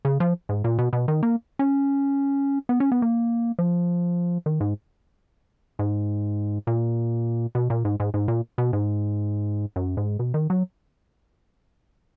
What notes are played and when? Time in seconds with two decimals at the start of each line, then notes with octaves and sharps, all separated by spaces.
0.05 C#3
0.20 F3
0.49 G#2
0.64 A#2
0.78 B2
0.93 B2
1.08 D#3
1.23 A#3
1.59 C#4
2.69 B3
2.80 C#4
2.92 B3
3.02 A#3
3.59 F3
4.46 D#3
4.60 G#2
5.79 G#2
6.67 A#2
7.55 B2
7.70 A#2
7.85 G#2
8.00 G#2
8.14 G#2
8.28 A#2
8.58 B2
8.73 G#2
9.76 F#2
9.97 G#2
10.19 B2
10.34 D#3
10.50 F#3